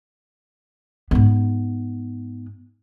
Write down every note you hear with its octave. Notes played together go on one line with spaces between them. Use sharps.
G#2 B3